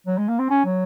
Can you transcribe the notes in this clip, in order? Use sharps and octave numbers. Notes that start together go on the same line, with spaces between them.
F#3
G#3
A#3
C4
C#4
F#3